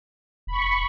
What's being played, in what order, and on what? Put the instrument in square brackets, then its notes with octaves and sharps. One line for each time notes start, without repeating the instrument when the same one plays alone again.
[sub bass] F1 [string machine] B5 C#6